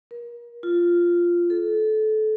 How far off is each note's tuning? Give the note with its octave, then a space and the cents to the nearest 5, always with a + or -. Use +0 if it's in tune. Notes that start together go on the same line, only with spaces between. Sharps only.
A#4 +35
F4 -5
A4 -25